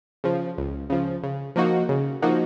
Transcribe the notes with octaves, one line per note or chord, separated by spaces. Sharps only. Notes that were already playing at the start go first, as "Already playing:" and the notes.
C#3 F3
C#2
C#3 F3
C#3
F3 A#3 D#4 F#4
C#3
F3 A#3 D#4 F#4